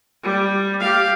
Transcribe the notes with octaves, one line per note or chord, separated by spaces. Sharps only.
G3
G4 F5